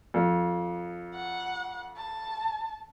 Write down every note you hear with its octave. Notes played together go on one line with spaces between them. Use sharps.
F2
F#5
A5